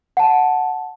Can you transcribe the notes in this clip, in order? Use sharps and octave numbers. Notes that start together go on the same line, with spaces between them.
F#5 A5